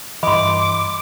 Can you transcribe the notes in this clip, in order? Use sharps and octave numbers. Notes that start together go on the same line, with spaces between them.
G2 E3 D#5 B5 C6 D6